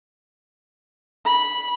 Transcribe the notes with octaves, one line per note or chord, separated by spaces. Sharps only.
B5